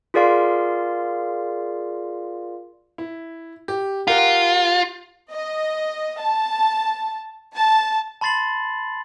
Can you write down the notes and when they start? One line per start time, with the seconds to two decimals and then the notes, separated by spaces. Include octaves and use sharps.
0.14 F4 G#4 A#4 D5 F5 C6
2.98 E4
3.68 G4
4.08 F4 G4 A#4 F#5
5.31 D#5
6.20 A5
7.56 A5
8.21 A5 B5 C6 A6 C7 F#7